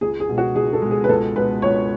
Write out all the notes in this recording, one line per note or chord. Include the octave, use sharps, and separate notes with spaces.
C#2 G#4
G#4
B2 G#3
F#4
C#2 G#4
A4
B2 G#3
G#4
B4
C#2 A4
B2 G#3 B4
C#2 C#5